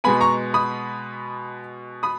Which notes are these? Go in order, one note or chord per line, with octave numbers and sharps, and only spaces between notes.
B2 G#3 B3 G#5 B5
A#5 C#6
B5 D#6
B5 D#6